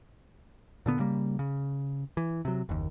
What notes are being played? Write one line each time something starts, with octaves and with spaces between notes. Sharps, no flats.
A#2 D3 B3
C#3 G3 A#3
C#3
E3
C3 F#3
F#1 D#2